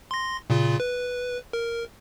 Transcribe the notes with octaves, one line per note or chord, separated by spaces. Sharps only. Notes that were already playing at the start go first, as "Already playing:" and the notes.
C6 A#6
A#2 C#3 F4
B4
A#4